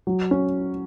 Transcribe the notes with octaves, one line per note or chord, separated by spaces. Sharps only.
F#3
C#4